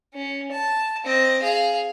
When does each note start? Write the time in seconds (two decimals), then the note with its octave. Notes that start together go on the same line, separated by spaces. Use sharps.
0.14 C#4
0.52 A5
1.05 C4 D#5
1.42 G#4 F5